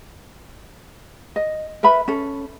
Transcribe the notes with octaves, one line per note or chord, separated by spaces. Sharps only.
D#5
A#4 B4 E5 B5
C#4 A4